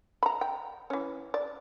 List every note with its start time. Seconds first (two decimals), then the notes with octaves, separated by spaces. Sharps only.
0.23 A#5 B5
0.41 G5
0.90 E3 C#4
1.34 D5